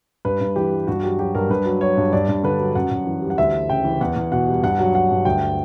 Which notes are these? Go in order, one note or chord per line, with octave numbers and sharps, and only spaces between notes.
G2 B4
G2
E3 G4
G3
G2 F#4
F#3 G4
F#3 G4
G2 A#4
G2 B4
F#3
F#3 C#5
G2
G2 D5
G2
D3 B4
F#3
F#2 F#5
F#2
E3
G3
F#5
D2 E5
G3
C#3 G5
E3
E2 F#5
E2
B2 F#5
G3
G2 F#5
F#3
F#3 F#5
G2
D2 G5